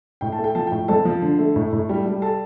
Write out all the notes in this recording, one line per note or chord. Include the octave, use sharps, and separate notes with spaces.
A2 G5
A5
A3
G5
F3 A5
A2 G5
F2 A4 A5
F3
D3
A3
A2
A2
G3
G3
A4 A5